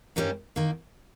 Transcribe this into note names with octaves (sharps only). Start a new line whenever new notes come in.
G2 D#3 G3 C#4
D#3 A#3